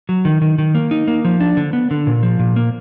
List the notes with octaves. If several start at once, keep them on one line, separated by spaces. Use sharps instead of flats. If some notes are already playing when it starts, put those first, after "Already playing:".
F#3
D#3
D#3
D#3
A#3
D#4
A#3
F3
D4
D3
B3
D3
A#2
F3
A#2
A#3